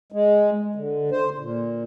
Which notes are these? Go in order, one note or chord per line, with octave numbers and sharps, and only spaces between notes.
G#3
D3
C5
A#2